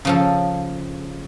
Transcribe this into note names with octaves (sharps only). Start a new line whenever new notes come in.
C#3 F3 A4